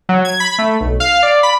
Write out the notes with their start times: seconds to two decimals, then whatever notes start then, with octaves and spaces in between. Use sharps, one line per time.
0.09 F#3
0.25 G#6
0.40 B5
0.58 A3
0.81 B1
1.00 F5
1.23 D5
1.43 B5